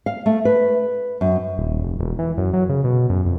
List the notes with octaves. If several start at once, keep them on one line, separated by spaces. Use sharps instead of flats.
F5
A3
B4
F#2
D#1
F1
E1
E3
F#2
F#3
C#3
B2
F#2
F2